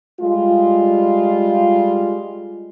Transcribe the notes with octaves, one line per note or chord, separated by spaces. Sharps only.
G3 G#3 F4